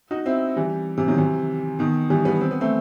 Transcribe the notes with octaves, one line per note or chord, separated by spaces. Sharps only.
D#4 F#4
C4 E4
E3 G3
C3 E3
D#3 F#3
C3 E3
B2 D#3
E3 G3
G3 B3
C4
B3
A3 C4